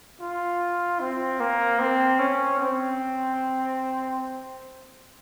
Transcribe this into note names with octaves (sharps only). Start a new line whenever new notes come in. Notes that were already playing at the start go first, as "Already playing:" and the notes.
F4
C4
A#3
C4
C#4
C4